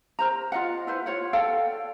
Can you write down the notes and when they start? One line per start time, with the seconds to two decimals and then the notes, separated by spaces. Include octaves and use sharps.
0.19 A#4 C5 A#5
0.52 F4 D#5 F5 F#5
0.87 E4 B4 C5
1.06 F4 C#5 F#5
1.33 A4 D5 F5 G5